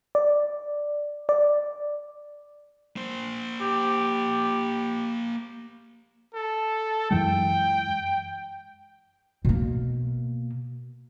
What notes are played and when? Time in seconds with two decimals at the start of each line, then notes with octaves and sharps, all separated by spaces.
0.15 D5
1.29 D5
2.96 A#3 C5
3.61 G4
6.35 A4
7.11 F#2 E3 G#3 G5
9.45 B2 A#3